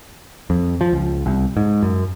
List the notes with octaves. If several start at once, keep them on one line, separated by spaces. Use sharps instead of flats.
F2
F3
C#2
C2
G#2
F#2